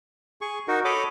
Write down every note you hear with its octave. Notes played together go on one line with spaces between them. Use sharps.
G#4 C#6
D#4 F#4 A#4
A4 C#5 D#5 B5 D6